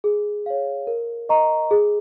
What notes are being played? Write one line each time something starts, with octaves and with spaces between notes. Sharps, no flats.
G#4
C#5 F5
A#4
D#5 A#5 C#6
G#4